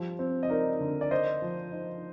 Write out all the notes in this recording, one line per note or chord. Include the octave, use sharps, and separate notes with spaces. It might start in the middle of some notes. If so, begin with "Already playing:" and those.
Already playing: F3 G3
C4
D#5
D#4 A#4 D5
D3
D5
A#4 C5 D#5
F3
D#4